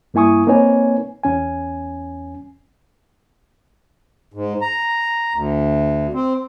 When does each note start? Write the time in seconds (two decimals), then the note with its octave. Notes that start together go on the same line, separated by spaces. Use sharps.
0.14 G2 A#3 E4 G#5 C#6 D#6
0.47 A#3 C4 D#4 B4 C#5 G#5
1.24 E2 C#4 G#5
4.34 G#2
4.61 A#5
5.33 D2
6.13 C4